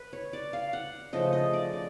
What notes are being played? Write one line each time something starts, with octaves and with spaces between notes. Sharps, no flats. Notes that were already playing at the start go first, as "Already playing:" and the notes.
Already playing: B4
C#5
D5
F5
F#5
C#3 F3 A3 D#5
D#5
D5
D5